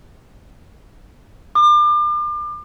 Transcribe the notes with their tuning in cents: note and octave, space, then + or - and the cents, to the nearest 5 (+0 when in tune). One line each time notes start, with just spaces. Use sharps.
D6 +35